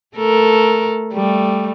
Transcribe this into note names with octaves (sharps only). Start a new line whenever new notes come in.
A3 A4 A#4
G3 A3